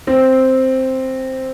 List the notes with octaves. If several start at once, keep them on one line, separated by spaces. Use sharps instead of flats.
C4